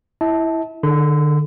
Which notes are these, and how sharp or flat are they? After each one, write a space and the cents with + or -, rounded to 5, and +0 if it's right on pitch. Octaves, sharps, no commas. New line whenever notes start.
E4 +0 E5 -40 A5 -5
D3 +40 A4 -40 C6 -40